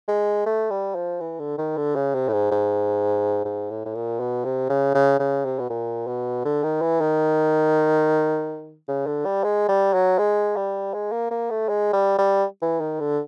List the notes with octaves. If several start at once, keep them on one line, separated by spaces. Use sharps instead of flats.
G#3
A3
G3
F3
E3
D3
D#3
D3
C#3
C3
A2
G#2
G#2
G#2
A2
A2
A#2
B2
C3
C#3
C#3
C#3
C3
B2
A#2
B2
D3
D#3
E3
D#3
C#3
D3
G3
G#3
G3
F#3
G#3
G3
G#3
A#3
A#3
A3
G#3
G3
G3
E3
D#3
D3